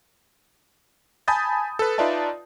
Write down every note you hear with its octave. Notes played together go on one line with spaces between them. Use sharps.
G#5 A5 B5 D#6 G6 A6
A4 B4
D#4 F4 B4 D5 E5 A5